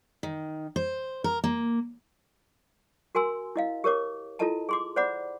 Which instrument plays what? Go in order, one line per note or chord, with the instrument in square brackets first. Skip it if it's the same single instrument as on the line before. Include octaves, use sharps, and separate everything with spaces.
[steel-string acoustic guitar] D#3
C5
A#4
A#3
[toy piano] F#4 A#4 G#5 C6 E6
E4 D#5 F5
G4 A#4 C#5 D6
E4 F4 A4 D#5 A5 A#5
G#4 C6 D6
C5 D5 F#5 B5 D6